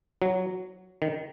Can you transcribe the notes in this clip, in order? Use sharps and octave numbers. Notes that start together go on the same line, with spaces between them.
F#3
D#3